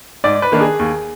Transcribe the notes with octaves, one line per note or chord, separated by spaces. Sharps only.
G#2 D5
B4
D#3 A#3 D4
G#4
D#2